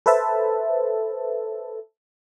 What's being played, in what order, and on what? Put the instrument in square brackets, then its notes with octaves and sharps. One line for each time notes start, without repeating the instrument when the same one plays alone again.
[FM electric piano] A4 B4 C5 E5 A5